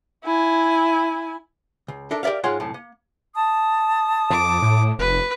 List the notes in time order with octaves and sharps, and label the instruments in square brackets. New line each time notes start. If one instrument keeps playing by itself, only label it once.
[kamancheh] E4 G#5
[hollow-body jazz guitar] C#2
D4 A4 A#4 E5
G4 A#4 D5 E5 F5
G#2 G#3 F4 C#5 F#5 C6
C2 F#2 A2
A#3
[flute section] A5 D#6
[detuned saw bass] F2 [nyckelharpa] D6
[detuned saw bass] A2
[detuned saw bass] F1 [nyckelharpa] B4